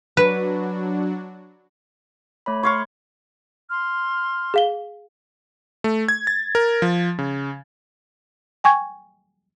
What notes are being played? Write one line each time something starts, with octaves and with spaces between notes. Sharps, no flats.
F#3 D4 F#4 B4
A3 C#5 B5
C#5 F5 C6 C#6
C6 F6
G#4 F5 G7
A3
G#6
A6
A#4
F3
C#3
G5 G#5 C#6 G#6